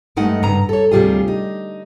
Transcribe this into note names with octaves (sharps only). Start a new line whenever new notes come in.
G2 G#3 A3 D#4 A#4 F#5
G2 C#3 A#5
A4 C#5
D2 C3 G3 F4 G#4
D#4